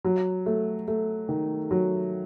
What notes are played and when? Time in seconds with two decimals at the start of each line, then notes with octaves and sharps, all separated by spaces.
0.04 F#3
0.46 A3
0.88 A3
1.29 D#3
1.71 F#3